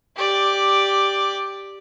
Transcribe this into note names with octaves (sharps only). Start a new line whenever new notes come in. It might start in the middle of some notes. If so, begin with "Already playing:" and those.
G4 D5